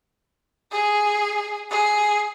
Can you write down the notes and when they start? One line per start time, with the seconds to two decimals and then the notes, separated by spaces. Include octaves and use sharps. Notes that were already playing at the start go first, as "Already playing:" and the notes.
0.72 G#4
1.70 G#4